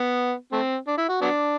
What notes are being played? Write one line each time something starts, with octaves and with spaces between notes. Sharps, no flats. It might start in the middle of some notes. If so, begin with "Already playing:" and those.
Already playing: B3
A3 C4
D4
E4
F#4
F#3 B3 D4